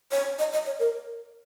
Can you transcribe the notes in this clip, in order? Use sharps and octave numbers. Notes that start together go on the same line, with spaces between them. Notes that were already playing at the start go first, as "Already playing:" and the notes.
C#5
D#5
D#5
C#5
A#4